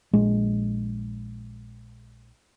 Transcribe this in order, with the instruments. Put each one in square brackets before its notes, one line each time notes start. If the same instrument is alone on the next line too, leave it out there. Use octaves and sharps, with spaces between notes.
[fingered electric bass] A#1 G#3